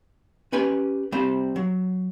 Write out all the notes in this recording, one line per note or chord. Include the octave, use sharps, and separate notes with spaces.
C#4 G4 B4 G#5
G3 C4 C5
F#3